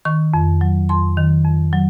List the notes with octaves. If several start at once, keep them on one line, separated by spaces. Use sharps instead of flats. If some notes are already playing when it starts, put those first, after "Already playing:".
D#3 C#6
F2
F#3
F2 C6
D#3
F2
F#3